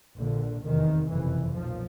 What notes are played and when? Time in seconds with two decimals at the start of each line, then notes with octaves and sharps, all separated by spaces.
0.17 A#1 A#2 D3
0.63 F1 E2 C3 D#3
1.09 F#1 F2 C3 E3
1.54 B1 A#2 F3